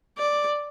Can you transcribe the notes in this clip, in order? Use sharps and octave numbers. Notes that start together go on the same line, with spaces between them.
D5